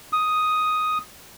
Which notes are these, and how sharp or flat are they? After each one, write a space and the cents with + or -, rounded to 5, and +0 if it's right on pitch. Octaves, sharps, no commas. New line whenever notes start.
D#6 +5